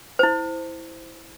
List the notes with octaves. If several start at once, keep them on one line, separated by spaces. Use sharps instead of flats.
E4 C5